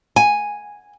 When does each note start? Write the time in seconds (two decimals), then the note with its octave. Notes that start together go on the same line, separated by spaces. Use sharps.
0.16 G#5